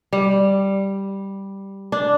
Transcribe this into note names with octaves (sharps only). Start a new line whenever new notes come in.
G3
D4